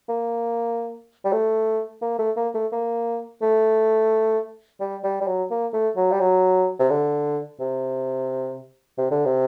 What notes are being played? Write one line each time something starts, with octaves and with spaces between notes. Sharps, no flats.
A#3
G3
A3
A#3
A3
A#3
A3
A#3
A3
G3
G3
G3
F#3
A#3
A3
F#3
G3
F#3
C3
D3
C3
C3
D3
C3